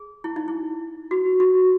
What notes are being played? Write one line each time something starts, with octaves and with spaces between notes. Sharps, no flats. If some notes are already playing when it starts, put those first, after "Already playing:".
Already playing: G#4
E4
D#4
E4
F#4
F#4